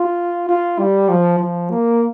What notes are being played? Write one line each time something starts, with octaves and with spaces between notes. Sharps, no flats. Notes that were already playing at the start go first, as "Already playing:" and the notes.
Already playing: F4
F4
G3
F3
F3
A#3